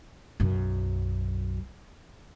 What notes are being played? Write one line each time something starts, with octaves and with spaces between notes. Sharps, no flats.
B1 F#2